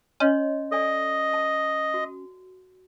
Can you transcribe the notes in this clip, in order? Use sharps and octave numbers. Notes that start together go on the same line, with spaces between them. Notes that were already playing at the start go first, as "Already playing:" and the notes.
C#4 C#5 D#5 C6
A4 D5 D#5 G#5
A5
F#4